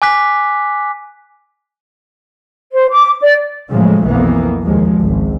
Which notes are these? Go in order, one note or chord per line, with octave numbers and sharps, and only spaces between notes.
G#5 D6 F#6 B6
C5
D6
D5
A2 C#3 F3 F#3 G#3 A3
B1 F2 E3 A#3 B3
D#2 F3 G#3
G#1 C#2